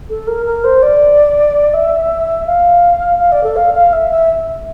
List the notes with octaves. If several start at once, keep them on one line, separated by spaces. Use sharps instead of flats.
A4
A#4
A#4
C5
D5
E5
F5
F5
D5
A4
F5
F5
E5
E5